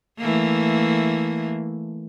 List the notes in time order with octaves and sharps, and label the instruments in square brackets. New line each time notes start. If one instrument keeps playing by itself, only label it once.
[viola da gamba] E3 A3 A#3